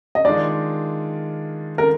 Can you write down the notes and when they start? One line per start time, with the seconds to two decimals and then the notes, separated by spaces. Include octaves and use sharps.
0.15 D#5
0.25 D#3 G#3 D4 F4 D5
1.78 A#4